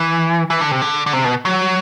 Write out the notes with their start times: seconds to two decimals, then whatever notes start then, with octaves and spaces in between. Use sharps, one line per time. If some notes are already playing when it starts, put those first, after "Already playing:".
Already playing: E3
0.50 E3
0.61 D3
0.71 C3
0.82 D3
1.06 D3
1.13 C3
1.25 B2
1.45 F#3